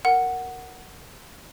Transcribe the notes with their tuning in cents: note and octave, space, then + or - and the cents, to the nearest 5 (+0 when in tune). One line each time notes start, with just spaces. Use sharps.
A#4 -10 F#5 +0